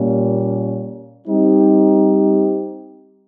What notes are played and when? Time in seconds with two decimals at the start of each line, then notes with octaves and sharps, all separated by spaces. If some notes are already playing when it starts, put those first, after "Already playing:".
Already playing: A#2 G3 A#3 C#4
1.27 G3 C4 D#4 G4